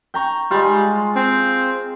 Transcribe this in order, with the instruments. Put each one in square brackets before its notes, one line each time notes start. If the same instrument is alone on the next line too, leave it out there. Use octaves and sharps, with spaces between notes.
[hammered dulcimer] G5 A#5 C#6
[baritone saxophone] G3 [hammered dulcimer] G#3 F4
[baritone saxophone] C4